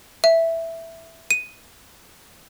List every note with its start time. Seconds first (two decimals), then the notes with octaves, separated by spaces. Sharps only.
0.24 E5
1.31 D#7